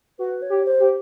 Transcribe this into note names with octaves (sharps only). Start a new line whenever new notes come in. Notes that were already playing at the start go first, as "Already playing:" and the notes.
F#4 B4
C#5
G4
C5
G4